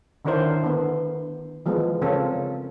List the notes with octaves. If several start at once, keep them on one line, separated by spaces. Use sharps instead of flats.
D3 D#3 D4 E4 A#4 C5
D3 B3
E3 F3 G#3 B3
C#3 C4 C#4 F4 A4 A#4